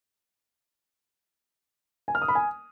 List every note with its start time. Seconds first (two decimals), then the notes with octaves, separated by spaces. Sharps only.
2.08 G#5
2.15 F6
2.22 D#6
2.28 B5
2.35 G#5